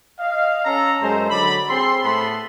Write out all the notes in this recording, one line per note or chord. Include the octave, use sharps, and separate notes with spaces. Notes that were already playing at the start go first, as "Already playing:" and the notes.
D#5 F5
C#4 A4 A#5
F#2 G#3 A3 C5 A5 A#5
D3 F#3 D5 B5
C4 G#4 A4 C6
A2 A3 B3 A4 B5 C6